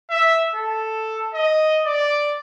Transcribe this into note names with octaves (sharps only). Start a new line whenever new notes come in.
E5
A4
D#5
D5